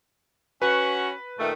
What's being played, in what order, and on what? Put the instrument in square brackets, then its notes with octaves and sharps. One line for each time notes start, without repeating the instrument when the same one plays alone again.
[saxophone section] C#4 F#4 [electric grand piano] B4
[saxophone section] A#2 D#3 A3